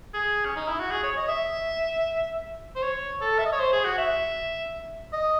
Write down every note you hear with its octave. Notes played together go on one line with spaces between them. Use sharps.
G#4
C#4
D#4
E4
F#4
G#4
C#5
D#5
E5
C5
C#5
A4
E5
D#5
C#5
C5
G#4
F#4
E5
D#5